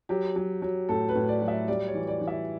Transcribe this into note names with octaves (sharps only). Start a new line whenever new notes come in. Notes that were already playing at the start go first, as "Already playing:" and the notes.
F#3 G4
F#3
F#3
A2 A4
B4
A2
D5
F#3
E5
G3 D5
C#5
E3
D5
E3
E5